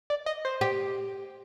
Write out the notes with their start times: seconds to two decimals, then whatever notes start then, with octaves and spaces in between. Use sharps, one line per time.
0.10 D5
0.26 D#5
0.45 C5
0.61 G4